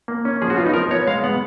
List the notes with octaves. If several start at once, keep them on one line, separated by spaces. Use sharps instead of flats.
A#3
C#4
F3 G#4
F#4
B3 F4
D#4
F3 A#4
B3 C#5
G#3 F5
B3 F#5